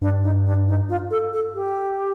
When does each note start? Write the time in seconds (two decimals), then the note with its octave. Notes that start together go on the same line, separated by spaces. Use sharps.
0.01 G2 D4
0.23 D#4
0.46 D4
0.68 D#4
0.89 F4
1.11 A4
1.33 A4
1.55 G4